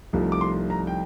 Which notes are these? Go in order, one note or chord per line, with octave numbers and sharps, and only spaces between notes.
C2 C3 F3 A3 D#4
D6
C6
A#5
G5